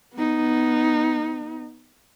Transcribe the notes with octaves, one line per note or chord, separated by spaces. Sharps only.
B3 D#4